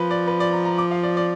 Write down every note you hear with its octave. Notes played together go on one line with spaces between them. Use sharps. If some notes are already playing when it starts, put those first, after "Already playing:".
Already playing: F3 B4
D5
B4
D5
A#5
A#5
D6
F5
D5
D5